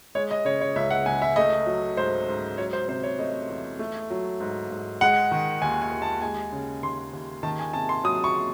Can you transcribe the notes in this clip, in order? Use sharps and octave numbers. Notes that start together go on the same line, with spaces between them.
G#3 C#5
D#5
C#3 C#5
C#5
C#2 E5
F#5
C#2 G#5
E5
A3 D#5
F#3
G#2 C5
G#2
F#3 C#5
C5
C3 C5
C#5
A3 D#5
E2
A3
F#3
G#2
G#2
G#3 F#5
D#3
D#2 G#5
G#5
D#2
A5
G#3 G#5
C#3
D#2 C6
D#2
D#3 A5
G#5
C3 A5
C6
F#3 D#6
C#6